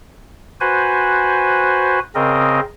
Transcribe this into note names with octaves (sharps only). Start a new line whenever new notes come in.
F#4 B4 C5 G#5
C#3 C4 A#4 D#5